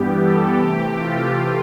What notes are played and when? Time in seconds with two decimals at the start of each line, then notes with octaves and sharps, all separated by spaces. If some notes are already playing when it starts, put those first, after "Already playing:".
Already playing: G2 E3 G3 B3 G4
0.20 A4
0.58 C3 E3 A3 G4
0.96 F4